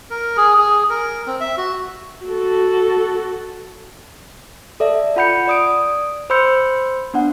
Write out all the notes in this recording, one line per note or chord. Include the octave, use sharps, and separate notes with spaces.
A#4
G#4
G#4
A#4
C4
E5
F#4
F#4 A4
A4 D5 E5
F4 F#5 B5 G6 C#7
D5 D#6 D7
C5 B5 C6 E6 G6 C#7
B3 D4 F#5